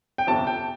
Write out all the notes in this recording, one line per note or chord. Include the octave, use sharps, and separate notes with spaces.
G5
G1 F2 C3 A5
G5